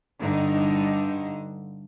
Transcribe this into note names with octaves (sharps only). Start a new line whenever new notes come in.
G2 D3 D#4